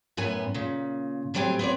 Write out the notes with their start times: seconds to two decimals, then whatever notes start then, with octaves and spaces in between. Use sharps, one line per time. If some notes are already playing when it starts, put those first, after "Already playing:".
0.17 F#2 A2 B3 B4 G#5
0.54 A#2 C#3
1.34 A2 F#3 G3 C4 G4 G#5
1.59 B3 C4 C#5 D5